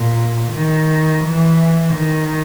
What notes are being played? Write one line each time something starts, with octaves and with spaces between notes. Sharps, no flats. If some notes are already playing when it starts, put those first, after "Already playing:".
Already playing: A#2
D#3
E3
D#3